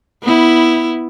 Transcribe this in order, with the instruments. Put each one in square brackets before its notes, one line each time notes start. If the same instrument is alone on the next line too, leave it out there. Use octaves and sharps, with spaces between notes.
[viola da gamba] B3 E4